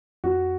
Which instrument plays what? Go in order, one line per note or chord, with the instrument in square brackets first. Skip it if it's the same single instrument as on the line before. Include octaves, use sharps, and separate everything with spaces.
[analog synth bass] F2 [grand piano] F#4